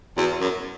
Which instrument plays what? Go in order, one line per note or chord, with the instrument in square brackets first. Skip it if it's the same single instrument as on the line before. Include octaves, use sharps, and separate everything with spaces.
[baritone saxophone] E2 [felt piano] F#4
[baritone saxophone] F#2